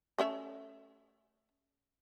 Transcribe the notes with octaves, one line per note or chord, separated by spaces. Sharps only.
A3 C#4 E5